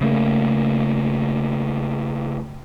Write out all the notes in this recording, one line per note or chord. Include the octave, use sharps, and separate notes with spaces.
C#3 A3 A#3